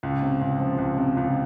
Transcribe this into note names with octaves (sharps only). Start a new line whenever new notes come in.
C#2
C3
C#2
F3
C#2
C3
C#2